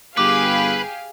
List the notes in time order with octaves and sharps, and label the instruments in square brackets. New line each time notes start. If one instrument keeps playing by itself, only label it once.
[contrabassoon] G1 [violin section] G4 G#4 F5 [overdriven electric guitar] B4 [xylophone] D6